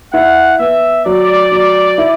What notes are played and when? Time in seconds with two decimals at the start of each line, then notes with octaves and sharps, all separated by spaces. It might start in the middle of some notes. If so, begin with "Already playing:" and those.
0.13 E4 F#5
0.59 B3 E5
1.06 F#3 D5
1.52 F#3
1.98 E4